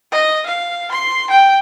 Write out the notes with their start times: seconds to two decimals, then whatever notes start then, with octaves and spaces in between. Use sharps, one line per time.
0.11 D#5
0.46 F5
0.91 C6
1.30 G5